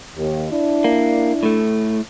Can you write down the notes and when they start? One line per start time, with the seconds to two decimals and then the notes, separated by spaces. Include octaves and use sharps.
0.17 D#2
0.51 D4 E4
0.84 A#3
1.43 A2 A3